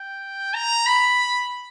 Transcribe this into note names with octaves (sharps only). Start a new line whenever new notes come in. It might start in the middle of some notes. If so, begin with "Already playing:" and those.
Already playing: G5
A#5
B5